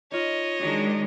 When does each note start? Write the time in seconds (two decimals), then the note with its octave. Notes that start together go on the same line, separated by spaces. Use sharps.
0.12 D#4 F4 C#5 D#5
0.61 D#3 F#3 G#3 D4